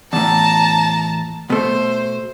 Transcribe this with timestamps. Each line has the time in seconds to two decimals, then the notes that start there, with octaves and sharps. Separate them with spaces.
0.13 E2 A2 A5 A#5
1.50 B2 A3 C5